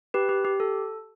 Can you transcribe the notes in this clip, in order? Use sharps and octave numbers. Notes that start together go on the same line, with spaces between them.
G4 B4
G4
G4
A4